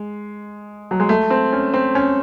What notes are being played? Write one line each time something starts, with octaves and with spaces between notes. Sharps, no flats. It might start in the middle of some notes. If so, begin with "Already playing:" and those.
Already playing: G#3
F#3
G#3
A3
C4
C#4
C4
C#4